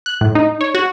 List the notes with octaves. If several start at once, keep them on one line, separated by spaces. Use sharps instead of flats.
F#6
A2
D#4
C#5
F#4